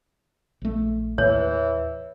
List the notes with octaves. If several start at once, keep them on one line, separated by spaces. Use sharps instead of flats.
A#1 A3
D#2 A2 E3 C#5